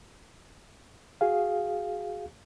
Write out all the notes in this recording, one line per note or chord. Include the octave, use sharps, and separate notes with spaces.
F#4 G#4 F5